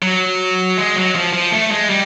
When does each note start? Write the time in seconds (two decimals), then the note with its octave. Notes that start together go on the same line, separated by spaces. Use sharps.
0.03 F#3
0.78 G#3
0.96 F#3
1.15 F3
1.33 F3
1.52 A3
1.71 G#3
1.90 G3